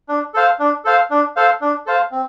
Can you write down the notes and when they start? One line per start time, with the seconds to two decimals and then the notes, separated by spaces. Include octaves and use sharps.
0.09 D4
0.34 A4 C5 F5
0.59 D4
0.85 A4 C5 F5
1.10 D4
1.36 A4 C5 F5
1.61 D4
1.86 A4 C5 F5
2.12 C4